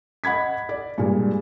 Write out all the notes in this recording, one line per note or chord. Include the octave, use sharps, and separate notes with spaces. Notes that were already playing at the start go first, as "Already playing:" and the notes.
D#5 F#5 B5 G#6 B6
D5
G2 A#2 G3 G#3